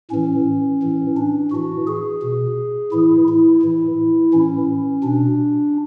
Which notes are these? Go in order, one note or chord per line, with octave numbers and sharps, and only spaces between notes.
A2 E3 C#4
A2 E3
D4
A2 E3 F#4
G#4
B2
A2 E3 E4
E4
A2 E3
A2 E3 C#4
B2 D4